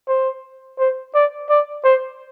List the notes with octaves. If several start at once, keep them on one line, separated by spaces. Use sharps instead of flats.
C5
C5
D5
D5
C5